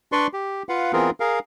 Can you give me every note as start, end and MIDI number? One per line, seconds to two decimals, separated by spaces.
0.12 0.27 62
0.12 0.27 71
0.12 0.27 74
0.12 0.27 84
0.12 0.27 85
0.34 0.63 67
0.69 0.92 65
0.69 0.92 71
0.69 0.92 77
0.69 0.92 78
0.93 1.10 52
0.93 1.10 59
0.93 1.10 60
0.93 1.10 65
0.93 1.10 68
0.93 1.10 70
1.20 1.39 68
1.20 1.39 70
1.20 1.39 77